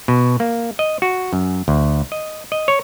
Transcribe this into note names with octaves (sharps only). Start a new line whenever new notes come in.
B2
A#3
D#5
F#4
F#2
D2
D#5
D#5
C#5